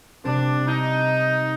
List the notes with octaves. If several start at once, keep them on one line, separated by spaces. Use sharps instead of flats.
C3 G3 C4 D4 G4 A#4
D#4